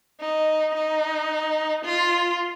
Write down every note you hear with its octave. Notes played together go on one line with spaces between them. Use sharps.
D#4
D#4
F4